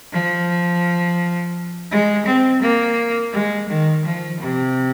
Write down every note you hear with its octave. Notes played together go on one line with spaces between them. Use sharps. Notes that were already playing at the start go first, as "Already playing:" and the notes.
F3
G#3
C4
A#3
G#3
D#3
F3
C3